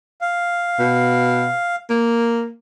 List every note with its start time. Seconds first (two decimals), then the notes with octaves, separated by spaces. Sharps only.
0.21 F5
0.79 B2
1.90 A#3